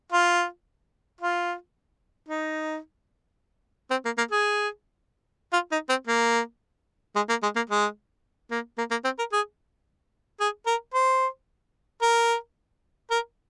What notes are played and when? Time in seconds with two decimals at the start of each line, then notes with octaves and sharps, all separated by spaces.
0.12 F4
1.21 F4
2.29 D#4
3.91 C4
4.05 A#3
4.18 A#3
4.31 G#4
5.53 F4
5.72 D#4
5.89 C4
6.07 A#3
7.16 G#3
7.29 A#3
7.43 G#3
7.56 A#3
7.70 G#3
8.51 A#3
8.78 A#3
8.91 A#3
9.04 C4
9.19 A#4
9.32 G#4
10.40 G#4
10.67 A#4
10.94 C5
12.02 A#4
13.11 A#4